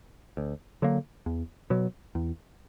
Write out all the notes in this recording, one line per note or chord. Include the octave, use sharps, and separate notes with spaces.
D2
D3 F#3 A#3
E2
B2 F#3
E2